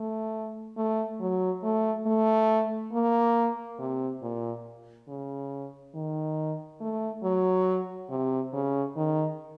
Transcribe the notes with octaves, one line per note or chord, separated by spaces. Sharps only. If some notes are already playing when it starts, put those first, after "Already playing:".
Already playing: A3
A3
F#3
A3
A3
A#3
C3
A#2
C#3
D#3
A3
F#3
C3
C#3
D#3